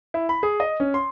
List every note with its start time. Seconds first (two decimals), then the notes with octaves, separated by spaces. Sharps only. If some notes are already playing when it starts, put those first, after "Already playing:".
0.14 E4
0.29 B5
0.43 G#4
0.60 D#5
0.80 C#4
0.94 C6